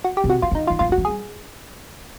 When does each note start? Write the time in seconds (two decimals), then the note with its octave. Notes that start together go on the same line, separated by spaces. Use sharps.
0.04 F#4
0.17 G4
0.24 C3
0.30 F#4
0.42 C#3 F4
0.51 D3 D#4
0.67 F4
0.70 E3
0.79 D#3 F4
0.89 F3 F#4
0.98 E3
1.05 G3 G#4